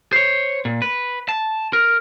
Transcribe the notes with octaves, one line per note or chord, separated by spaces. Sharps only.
C5 C#5
A#2
B4
A5
A#4